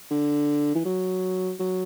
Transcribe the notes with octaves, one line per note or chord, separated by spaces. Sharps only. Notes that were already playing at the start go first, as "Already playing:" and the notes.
D3
E3
F#3
F#3